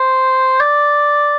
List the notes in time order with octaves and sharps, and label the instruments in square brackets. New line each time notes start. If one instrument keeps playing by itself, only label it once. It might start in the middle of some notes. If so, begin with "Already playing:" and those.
Already playing: [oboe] C5
D5